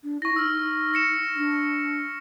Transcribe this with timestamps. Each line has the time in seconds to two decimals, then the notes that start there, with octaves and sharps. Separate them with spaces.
0.04 D4
0.22 E4 C#6 A#6
0.36 D#4 E6 F6
0.94 A#6 C#7 E7
1.36 D4